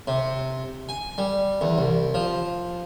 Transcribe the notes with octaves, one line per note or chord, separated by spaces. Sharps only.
C3
G#5
G3
E2
C2
F3